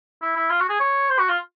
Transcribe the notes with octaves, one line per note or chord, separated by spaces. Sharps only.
E4
E4
F4
F#4
G#4
C#5
C5
F#4
F4